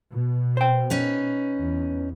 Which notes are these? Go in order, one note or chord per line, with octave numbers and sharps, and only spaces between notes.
B2
C5 G5
C#4 D#4 B4
E2